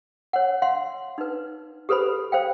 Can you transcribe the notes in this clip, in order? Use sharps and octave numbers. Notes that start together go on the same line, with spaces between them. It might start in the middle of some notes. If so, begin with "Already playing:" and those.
C#5 F#5
F5 F#5 C6
D#4 B4
G4 A4 B4 C5 B5
C5 F5 G5